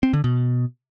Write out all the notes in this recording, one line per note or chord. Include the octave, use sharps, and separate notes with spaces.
C4
D3
B2